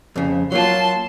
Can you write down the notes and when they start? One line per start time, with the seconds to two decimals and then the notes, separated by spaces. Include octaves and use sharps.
0.16 F2 C#3
0.52 F#3 A#3 F4 A5 C6